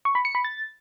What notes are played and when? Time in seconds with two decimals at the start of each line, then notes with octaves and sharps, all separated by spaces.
0.05 C#6
0.15 B5
0.25 C#7
0.35 B5
0.44 A6